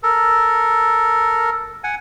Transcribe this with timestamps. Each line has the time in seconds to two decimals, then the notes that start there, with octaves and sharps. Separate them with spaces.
0.03 A4 A#4
1.84 F#5 G#5